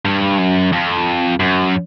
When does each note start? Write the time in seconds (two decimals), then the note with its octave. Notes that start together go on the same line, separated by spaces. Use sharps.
0.05 G2
0.38 F#2
0.72 F2
1.40 F#2